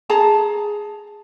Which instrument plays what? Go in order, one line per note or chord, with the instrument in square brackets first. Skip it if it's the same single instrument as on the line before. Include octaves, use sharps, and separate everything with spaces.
[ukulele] G#4 A5 A#5